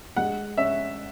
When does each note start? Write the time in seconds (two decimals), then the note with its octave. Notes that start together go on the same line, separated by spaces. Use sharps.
0.17 G#3 F#5
0.58 C#4 E5